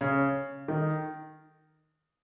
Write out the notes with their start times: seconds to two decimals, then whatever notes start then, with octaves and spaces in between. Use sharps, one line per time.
0.01 C#3
0.68 D#3